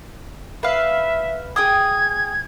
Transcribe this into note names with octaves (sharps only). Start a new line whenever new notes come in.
B4 E5 F5
G#4 G5 D#6 G#6